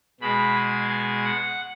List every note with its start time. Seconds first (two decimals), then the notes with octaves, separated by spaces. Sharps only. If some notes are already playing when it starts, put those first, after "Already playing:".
0.20 B2 G#3 B5
0.56 G#5
0.90 G#5
1.25 F#5